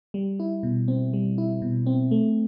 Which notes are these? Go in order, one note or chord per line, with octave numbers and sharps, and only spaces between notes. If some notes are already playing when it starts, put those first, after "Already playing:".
G3
E4
B2
C4
G3
E4
B2
C4
A3